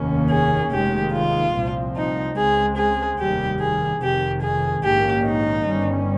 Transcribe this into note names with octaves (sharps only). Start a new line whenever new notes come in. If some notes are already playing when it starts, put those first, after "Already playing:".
Already playing: F1 D#2 D#3 A#3 C#4
G#4
F1 D#2 D#3 G#3 G4
F4
C2 A#2 F3 C4
D#4
C#2 C#3 G#3 C4 G#4
G#4
F1 D#2 D#3 G3 G4
G#4
F1 F2 C3 D#3 G4
G#4
A#1 G#2 D#3 A#3 C#4 G4
D#4
G1 G2 G3 C#4